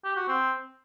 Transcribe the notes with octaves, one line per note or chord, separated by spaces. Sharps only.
G4
F#4
C4